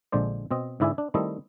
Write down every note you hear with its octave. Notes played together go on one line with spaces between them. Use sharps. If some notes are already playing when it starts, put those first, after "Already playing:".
A#1 D3 G#3 C5 D5
B2 C4 D#5
G#2 D3 E4 D5 E5 G#5
D4
D#3 G3 A3 C4 E4 D#5